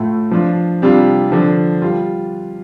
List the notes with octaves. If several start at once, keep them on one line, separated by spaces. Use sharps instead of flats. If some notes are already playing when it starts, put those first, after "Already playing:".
Already playing: A2 A3 F4
F3 D4 F4
C3 G3 D4 F4
D3 F3 D4
G3 F4